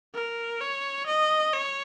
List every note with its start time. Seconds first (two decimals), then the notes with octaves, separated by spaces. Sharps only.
0.15 A#4
0.61 C#5
1.07 D#5
1.53 C#5